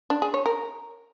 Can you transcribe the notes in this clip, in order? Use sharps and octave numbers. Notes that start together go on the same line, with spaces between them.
D4
G#4
C#5
A#4